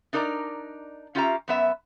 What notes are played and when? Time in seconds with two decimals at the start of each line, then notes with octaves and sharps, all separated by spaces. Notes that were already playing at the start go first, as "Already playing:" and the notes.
0.13 D4 D#4 A#4 D5 A5 A#5
1.15 C#4 F4 G4 E5 F5 A#5
1.48 F#2 B3 E5